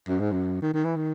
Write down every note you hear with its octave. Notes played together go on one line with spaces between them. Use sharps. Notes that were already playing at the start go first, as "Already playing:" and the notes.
F#2
G#2
F#2
D#3
D#3
E3
D#3